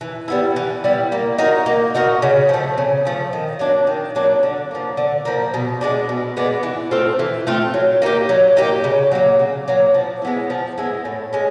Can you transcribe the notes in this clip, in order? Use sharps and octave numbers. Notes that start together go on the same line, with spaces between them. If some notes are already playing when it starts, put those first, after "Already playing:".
E3
G3 B3 E4
E3
G3 B3 E4
A#3
D#4 F#4 A#4
A#3
D#4 F#4 A#4
C#3
F3 A3
C#3
F3 A3
D#3
F#3 A#3 D4
D#3
F#3 A#3 D4
D3
F3 A#3
D3
F3 A#3
B2
G#3 B3 D4
B2
G#3 B3 D4
E3
A3 C4 F4
E3
A3 C4 F4
F#3
A#3 D#4 G4
F#3
A#3 D#4 G4
C#3
F#3 A#3
C#3
F#3 A#3
F3
G#3 B3 E4
F3
G#3 B3 E4
A2
G#3 C#4